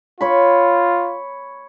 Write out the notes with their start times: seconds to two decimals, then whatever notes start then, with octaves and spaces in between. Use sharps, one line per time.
0.21 F4 C#5 B5